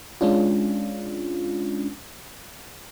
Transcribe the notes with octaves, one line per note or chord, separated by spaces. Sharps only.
G#3 C#4 D4 F4